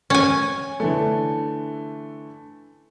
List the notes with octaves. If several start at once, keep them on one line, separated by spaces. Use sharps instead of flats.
C#4 G#5
D3 E3 A3